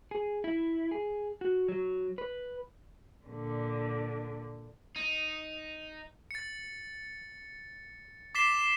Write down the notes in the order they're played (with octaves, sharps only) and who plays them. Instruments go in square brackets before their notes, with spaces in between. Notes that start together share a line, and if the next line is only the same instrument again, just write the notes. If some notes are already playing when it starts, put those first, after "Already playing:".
[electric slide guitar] G#4
E4
G#4
F#4
F#3
B4
[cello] A#2 D3
[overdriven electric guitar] D#4
[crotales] A6 C#7
D6 A6 B6 C7 E7 G7